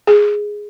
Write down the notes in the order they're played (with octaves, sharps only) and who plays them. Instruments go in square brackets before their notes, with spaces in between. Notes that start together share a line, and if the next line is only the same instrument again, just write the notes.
[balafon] G#4